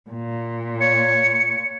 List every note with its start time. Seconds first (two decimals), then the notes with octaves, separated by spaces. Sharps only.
0.10 A#2
0.81 C#5 C#7